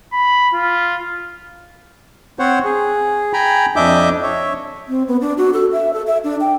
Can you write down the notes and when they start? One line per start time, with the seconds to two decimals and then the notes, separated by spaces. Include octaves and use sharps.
0.12 B5
0.54 F4
2.39 C4 C5 C#5 F#5
2.64 G#4
3.33 G5 G#5 A#5 B5
3.76 F2 D4 D#5 E5 D6 G6
4.23 C#5 E5
4.89 C4
5.08 B3
5.21 D4
5.38 F#4
5.53 A4
5.73 E5
5.93 A4
6.07 E5
6.24 D4
6.41 G5